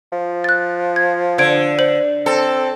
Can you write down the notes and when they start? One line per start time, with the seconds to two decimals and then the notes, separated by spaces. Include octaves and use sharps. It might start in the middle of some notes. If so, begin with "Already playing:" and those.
0.12 F3
0.44 F#6 A6
0.96 G#6
1.38 D3 C5 G#6 D7
1.79 C5 F#7
2.26 C4 A4